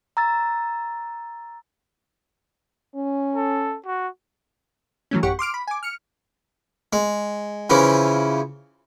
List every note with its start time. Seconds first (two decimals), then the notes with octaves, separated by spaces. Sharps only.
0.17 A#5 E6 A6
2.95 C#4
3.36 A4
3.86 F#4
5.11 E3 F#3 A3 C#4
5.23 A1 F#2 G4 F#5 C#6
5.39 C6 D6 F6 D7
5.54 B5
5.67 G#5 D6
5.83 F6 C#7
6.93 G#3
7.70 C#3 E3 F3